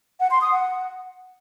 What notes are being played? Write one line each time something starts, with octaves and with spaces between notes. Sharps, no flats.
F#5
C6
D#6
F#5